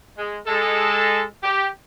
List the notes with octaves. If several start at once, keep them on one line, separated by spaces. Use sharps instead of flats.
G#3
G#3 A4
G4